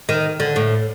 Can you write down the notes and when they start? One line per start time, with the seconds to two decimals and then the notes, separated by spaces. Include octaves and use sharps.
0.09 D#3
0.40 D3
0.56 A2